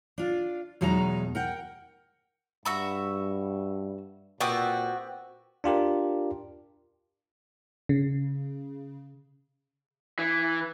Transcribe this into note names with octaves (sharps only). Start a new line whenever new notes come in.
D4 F4
E2 B2 F#3 G#3 D#4 A#5
A#4 F#5 G5
G2 F#4 E5 B5
A#2 B3 C4 F#4 G4
D4 F4 G4 A#4
C#3
E3